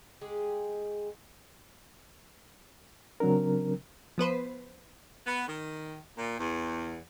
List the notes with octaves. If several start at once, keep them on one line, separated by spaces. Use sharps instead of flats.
G#3 G4 G#4
C#3 F#3 C4 D4 A#4
F3 B3 B4 C5
B3
D#3
A#2
E2